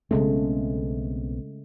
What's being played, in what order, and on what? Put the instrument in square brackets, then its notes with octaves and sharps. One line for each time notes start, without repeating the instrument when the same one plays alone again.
[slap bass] B1 B3 C4 [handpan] C#3 G#3 A3